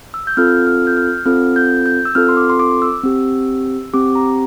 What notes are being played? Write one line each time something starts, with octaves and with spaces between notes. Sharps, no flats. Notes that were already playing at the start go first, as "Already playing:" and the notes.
E6
G6
C4 F4 A4 F6
F6
G6
F6
C4 F4 A4 F6
G6
G6
E6
C4 F4 A4 F6
C6
D6
C6
D6
E6
C4 G4
C4 G4 D6
A#5